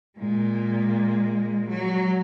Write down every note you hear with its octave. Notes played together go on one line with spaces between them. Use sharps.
A#2 G#3
F#3